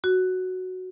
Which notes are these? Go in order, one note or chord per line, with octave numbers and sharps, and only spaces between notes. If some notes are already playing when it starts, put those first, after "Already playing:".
F#4